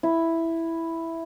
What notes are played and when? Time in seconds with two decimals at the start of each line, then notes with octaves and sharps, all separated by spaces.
0.03 E4